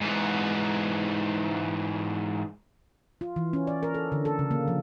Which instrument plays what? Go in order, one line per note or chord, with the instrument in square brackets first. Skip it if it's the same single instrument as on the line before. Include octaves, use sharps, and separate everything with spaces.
[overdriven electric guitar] G#2 E3
[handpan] F4
E3
C#4
D5
A#4
A4
D3
A4
C#3
A#3
F3